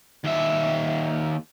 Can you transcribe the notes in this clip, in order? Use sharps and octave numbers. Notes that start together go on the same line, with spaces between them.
D#2 E5